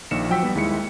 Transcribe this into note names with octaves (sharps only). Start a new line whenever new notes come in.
A#1 D#3 A#3 C#7 E7
F3 F#3 F#5 G5 E6 B6
G3 B3
D#2 G#3 E4 C#7